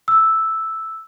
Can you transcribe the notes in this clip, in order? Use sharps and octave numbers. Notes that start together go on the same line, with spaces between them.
E6